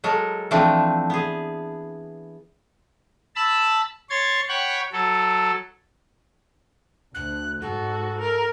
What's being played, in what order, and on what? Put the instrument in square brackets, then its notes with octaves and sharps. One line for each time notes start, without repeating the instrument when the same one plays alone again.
[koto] F#3 G#3 A4 A#4
E3 F3 A3 C4 D4
B3 G#4
[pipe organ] A5 B5 E6
C#5 C6 G#6 A6
C#5 F#5 G5 B5 C#6
F#3 A4
[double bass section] D2 [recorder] F#6
[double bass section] G#2 [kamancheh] F#4 [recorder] A4
[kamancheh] A#4